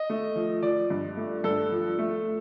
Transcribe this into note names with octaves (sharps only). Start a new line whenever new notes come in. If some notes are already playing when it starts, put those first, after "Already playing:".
Already playing: D#5
A3
F3
F3 D5
G2
A3
G2 A4
F3
A3